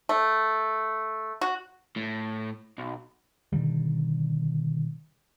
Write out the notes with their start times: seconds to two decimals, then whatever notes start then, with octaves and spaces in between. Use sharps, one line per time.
0.09 A3
1.41 F#4
1.96 A2
2.78 B1
3.53 B2 D3 D#3 G3